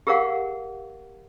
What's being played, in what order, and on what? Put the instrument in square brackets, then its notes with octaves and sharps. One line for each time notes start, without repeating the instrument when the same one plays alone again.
[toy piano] G4 G#4 A#4 C#5 F5 F#5